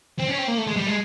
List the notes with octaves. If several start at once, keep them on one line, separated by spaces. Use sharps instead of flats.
C4
C#4
C4
A#3
A3
G#3
G3
G#3